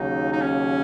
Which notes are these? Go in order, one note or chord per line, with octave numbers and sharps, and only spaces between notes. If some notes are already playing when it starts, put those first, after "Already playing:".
Already playing: D#2 C#3 F#3 D#4
D#4
C#4